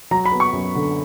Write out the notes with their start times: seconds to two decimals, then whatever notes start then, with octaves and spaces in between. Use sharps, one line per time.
0.11 F#3 A#5
0.26 B5
0.32 B3
0.40 C#6
0.53 F#2
0.75 D3